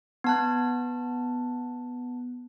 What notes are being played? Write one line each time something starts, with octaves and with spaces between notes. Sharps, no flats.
B3 A5 F#6